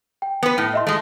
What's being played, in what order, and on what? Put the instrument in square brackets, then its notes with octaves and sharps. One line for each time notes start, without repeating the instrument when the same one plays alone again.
[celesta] G5
[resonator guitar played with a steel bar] B3 B4
A2
[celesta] D#5 E5 C6
[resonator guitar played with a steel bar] G#3 A3